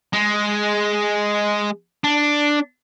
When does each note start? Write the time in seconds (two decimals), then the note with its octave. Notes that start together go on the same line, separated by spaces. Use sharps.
0.13 G#3
2.04 D4